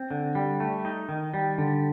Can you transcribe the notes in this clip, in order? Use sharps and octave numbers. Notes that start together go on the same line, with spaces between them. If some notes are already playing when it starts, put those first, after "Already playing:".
Already playing: C4
D3
G3
A3
D#4
D#3
G3
D3